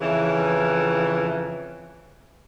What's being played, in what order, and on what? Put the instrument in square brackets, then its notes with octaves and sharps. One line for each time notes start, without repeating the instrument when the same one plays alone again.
[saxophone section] F2 C#3 E3